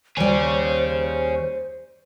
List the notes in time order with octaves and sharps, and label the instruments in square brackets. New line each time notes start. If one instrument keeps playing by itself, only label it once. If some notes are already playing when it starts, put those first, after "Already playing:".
[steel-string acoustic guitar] D#2 G3 [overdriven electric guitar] G#4 C#5 [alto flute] C5